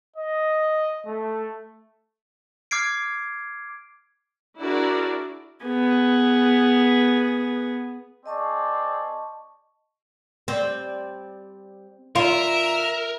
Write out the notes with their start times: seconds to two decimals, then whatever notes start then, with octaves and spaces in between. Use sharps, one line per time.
0.16 D#5
1.06 A3
2.71 D6 F6 G#6 C7 D7
4.61 D4 E4 F#4 G#4 A#4 D5
5.65 B3 G#4
8.26 C4 G#4 D5 D#5 A5 C#6
10.48 G3 C4 D5
12.16 D3 F4 A#4 E5